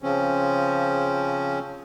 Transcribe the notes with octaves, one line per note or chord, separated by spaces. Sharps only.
C#3 F3 C4 C#4